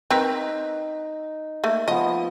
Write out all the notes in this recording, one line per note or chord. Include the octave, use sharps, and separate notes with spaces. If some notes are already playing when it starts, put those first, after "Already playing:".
C4 D#4 A#4 B4
A3 A#3
F3 B3 D#5